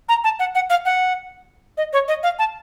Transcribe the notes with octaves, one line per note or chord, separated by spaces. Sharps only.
A#5
A5
F#5
F#5
F5
F#5
D#5
C#5
D#5
F5
A5